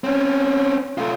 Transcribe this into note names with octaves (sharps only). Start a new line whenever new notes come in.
C4 C#4
A3 F4